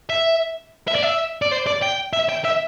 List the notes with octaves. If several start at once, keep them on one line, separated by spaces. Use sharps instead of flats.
E5
E5
D5
E5
D5
C5
D5
G5
E5
G5
E5